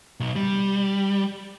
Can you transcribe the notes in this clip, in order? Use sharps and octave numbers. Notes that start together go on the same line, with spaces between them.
B1
G3